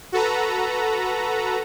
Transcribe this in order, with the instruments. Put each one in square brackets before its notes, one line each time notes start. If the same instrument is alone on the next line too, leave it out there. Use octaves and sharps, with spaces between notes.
[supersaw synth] F#4 A4 B4 A#5